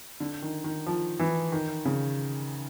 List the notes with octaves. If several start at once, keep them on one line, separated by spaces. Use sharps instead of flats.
D3
D#3
D#3
F3
E3
D#3
C#3